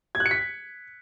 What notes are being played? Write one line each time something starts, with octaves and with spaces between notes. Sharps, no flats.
G#6
F#6
C#7
B6